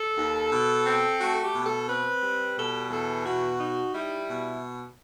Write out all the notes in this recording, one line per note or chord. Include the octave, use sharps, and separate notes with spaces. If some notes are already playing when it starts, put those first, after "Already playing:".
Already playing: A4
D#2
B2
C4
A3 F#4
A4
G4
B2
A4
C4 B4
G3
B2 A4
E2 A4
B2 F#4
D#4
G3 E4
B2